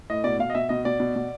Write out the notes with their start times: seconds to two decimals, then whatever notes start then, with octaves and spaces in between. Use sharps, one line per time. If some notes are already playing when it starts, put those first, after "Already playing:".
0.10 A2 D#5
0.24 B2 D5
0.39 B2 F5
0.50 D#5
0.55 B2 E5
0.69 B2 D#5
0.85 B2 D5
1.00 B2
1.16 B2